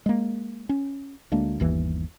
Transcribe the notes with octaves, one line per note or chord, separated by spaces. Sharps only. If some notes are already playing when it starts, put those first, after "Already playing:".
G#3 A#3
C#4
D2 G#3 A#3 D4
G1 D#2 E3